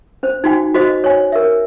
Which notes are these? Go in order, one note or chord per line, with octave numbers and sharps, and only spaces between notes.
C#4 C5
D#4 F#4 G5 G#5
F#4 C5 D#5
C#5 G#5
A#4 E5